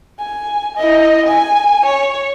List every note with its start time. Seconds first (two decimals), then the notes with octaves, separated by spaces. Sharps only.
0.19 G#5
0.78 E4 D#5
1.26 G#5
1.86 C#5